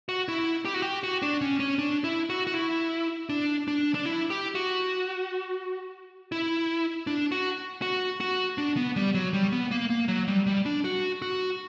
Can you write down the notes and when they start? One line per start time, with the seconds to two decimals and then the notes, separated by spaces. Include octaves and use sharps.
0.09 F#4
0.28 E4
0.65 G4
0.74 F#4
0.82 G4
1.03 F#4
1.22 D4
1.41 C#4
1.60 C#4
1.79 D4
2.04 E4
2.30 F#4
2.47 F#4
2.54 E4
3.29 D4
3.68 D4
3.95 D4
4.06 E4
4.30 G4
4.55 F#4
6.32 E4
7.07 D4
7.32 F#4
7.82 F#4
8.20 F#4
8.58 D4
8.77 B3
8.96 G3
9.14 F#3
9.33 G3
9.52 B3
9.71 A#3
9.90 A#3
10.08 F#3
10.28 G3
10.46 G3
10.66 D4
10.84 F#4
11.22 F#4